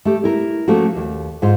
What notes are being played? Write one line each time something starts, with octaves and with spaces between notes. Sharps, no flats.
A3 G4
E4 A#4
F3 A3 A#3 C#4 F#4
D#2
G#2 F4 C5